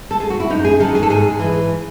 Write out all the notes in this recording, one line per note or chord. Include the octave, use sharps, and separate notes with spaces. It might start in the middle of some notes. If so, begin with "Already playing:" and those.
A4
G#4
F#4
E4
F#2 D#4
G#4
D#3 F#3 A4
G#4
A4
G#2 G#4
E3